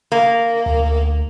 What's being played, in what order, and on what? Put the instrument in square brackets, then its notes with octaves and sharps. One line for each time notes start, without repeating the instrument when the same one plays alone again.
[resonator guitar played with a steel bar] A#3
[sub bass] D2